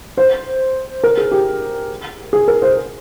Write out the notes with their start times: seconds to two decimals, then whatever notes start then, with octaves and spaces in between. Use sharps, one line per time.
0.17 C5
1.03 A#4
1.17 G#4
1.31 G4
2.33 G#4
2.48 A#4
2.62 C5